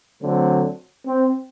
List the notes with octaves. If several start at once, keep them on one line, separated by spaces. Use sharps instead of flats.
D3 F#3 A3 C4
C4